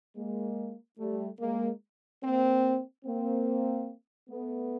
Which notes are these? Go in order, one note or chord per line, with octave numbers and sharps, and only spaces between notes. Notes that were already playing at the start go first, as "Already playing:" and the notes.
G#3 A#3
G3 A3
G#3 A#3
A#3 C4
A#3 C4
A3 B3